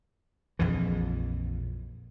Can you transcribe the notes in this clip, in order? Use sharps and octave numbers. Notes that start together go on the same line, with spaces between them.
A#1 F2 E3